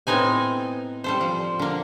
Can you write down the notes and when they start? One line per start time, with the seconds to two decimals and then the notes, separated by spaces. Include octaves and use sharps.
0.07 A2 B3 C4 D#4 G#5
1.04 G3 A4 C5
1.21 F3
1.59 D3 A#3